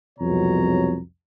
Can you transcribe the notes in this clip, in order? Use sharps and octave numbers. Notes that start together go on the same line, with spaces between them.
C2 F2 B2 F#3 C#5 A#5